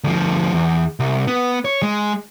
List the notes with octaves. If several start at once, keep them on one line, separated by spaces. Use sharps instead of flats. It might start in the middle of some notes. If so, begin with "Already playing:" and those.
D2 F3
E2
C2
B3
C#5
G#3